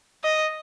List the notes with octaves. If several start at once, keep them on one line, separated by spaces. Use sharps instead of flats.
D#5